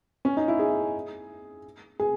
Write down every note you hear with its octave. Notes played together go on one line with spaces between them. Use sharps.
C#4
D#4
E4
G#4
G#4